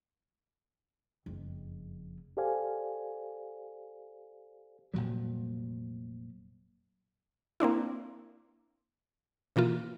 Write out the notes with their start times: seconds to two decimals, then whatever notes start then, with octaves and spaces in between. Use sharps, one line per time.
1.26 F#1 F2
2.37 G4 A4 C5 D5 F5 G#5
4.94 F1 A#2 F#3 G3
7.60 A#3 C4 D4 E4
9.56 B2 E3 A#3 F4